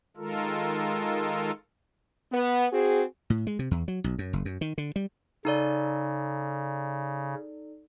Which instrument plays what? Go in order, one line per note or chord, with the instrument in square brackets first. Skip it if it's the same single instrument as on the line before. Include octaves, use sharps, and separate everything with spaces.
[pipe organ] D#3 G#3 F4 A4 A#4
[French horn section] B3
C4 F#4 G#4
[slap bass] A2
G#3
C3
E2
F#3
B1
F#2
F#1
F#2
D#3
D3
G3
[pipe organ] C#3 [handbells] D#4 A4 D5